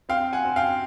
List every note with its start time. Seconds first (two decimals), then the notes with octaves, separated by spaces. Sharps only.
0.09 C4 F5 G5
0.33 F#5 G#5
0.45 C4
0.56 F5 G5